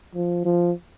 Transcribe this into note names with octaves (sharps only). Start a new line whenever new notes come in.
F3
F3